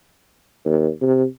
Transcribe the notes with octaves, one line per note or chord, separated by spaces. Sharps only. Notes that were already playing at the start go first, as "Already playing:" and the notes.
D#2
C3